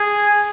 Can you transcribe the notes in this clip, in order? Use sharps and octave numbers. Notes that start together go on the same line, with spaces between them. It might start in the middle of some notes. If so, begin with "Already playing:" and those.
Already playing: G#4